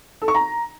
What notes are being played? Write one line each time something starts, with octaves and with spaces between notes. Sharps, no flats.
A4
C#6
A#5